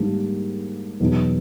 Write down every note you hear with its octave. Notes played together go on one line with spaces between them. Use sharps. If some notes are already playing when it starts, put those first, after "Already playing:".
Already playing: G#2 D#3 G3 A#3 D4
E2 B2 F#3 B3 D#4